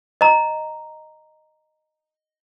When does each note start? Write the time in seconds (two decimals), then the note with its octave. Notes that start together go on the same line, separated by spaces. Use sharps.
0.21 D#5 A#5